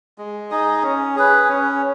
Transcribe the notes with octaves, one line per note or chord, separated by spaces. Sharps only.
G#3
D#4 G#4 D#5
C#4
G#4 B4
C#4